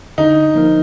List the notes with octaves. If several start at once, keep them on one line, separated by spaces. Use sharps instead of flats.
D3 D#4
F3 A#3 D#4 A#4